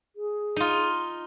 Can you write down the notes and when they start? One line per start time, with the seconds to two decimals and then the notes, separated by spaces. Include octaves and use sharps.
0.16 G#4
0.56 D#4 F4